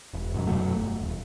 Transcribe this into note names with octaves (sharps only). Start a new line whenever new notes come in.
E1
F#2 B2 E3 F#3
F2 B2 F#3 A3
G1
D#1